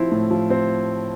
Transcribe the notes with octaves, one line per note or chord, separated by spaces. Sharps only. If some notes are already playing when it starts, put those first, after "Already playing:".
Already playing: F3 C4 E4
A2
F3
C4